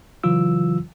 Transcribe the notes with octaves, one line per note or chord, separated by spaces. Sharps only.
C#3 E3 F#3 F4 E6